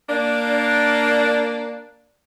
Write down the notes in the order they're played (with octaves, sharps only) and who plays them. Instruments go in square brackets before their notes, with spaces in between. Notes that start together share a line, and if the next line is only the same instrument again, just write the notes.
[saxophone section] A#3 D4